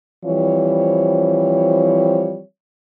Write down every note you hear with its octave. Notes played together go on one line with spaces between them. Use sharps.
E3 F3 G3 C4 C#5